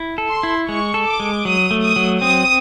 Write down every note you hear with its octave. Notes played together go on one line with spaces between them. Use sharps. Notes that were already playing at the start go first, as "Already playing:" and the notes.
Already playing: E4
A4
C6
E4
G#3 C#6
A4
D6
G#3
F#3 D#6
A3
D#6
F#3
C4 D#6